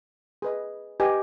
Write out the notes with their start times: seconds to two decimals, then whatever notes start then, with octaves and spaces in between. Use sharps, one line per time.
0.42 G#4 B4 D#5
1.00 G4 B4 D#5 G#5